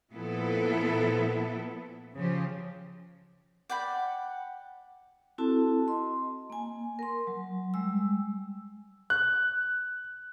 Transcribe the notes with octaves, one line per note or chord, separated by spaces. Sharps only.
A#2 F3 B3 E4 A4
C#3 F3 G4
D5 F#5 G5 B5
C4 E4 F#4 A4 A5
D#5 C6
A#3 G#5
A#4 C6
F#3
G3 G#3 E6
F#6